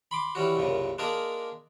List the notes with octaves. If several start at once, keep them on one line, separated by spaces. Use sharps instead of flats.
B5 C6 D6
E3 G3 C#4 F#4
C2 F#2 A#2 C#3
G#3 A#3 D4 G#4 A#4